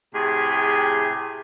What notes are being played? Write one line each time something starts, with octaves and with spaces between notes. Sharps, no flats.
A2 C3 G4 G#4